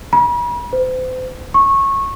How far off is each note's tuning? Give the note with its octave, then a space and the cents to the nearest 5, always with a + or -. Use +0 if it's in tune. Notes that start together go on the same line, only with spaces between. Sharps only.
B5 -45
C5 -40
C#6 -20